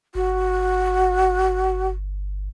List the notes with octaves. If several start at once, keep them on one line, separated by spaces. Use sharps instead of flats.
G1 F#4